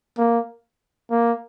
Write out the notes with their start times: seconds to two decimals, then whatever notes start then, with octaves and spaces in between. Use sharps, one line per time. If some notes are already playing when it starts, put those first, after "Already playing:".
0.18 A#3
1.11 A#3